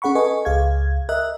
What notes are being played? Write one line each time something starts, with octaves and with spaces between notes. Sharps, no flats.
C#4 G#4 F#5 B5 C#6
A4 B4 D#5 G#5 C#6
C#2 G#4 F5 G#6
A#4 D#5 E5 F#6